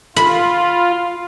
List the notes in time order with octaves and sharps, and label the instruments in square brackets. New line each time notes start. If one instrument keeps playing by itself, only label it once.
[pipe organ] F4 [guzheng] B5